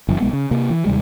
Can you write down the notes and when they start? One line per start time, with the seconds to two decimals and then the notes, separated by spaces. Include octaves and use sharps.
0.08 F#1 F#2 B2 E3
0.20 B1 G#3 B3
0.33 C#3
0.51 C3 A#3
0.70 E3
0.85 D#2 C3 G3 G#3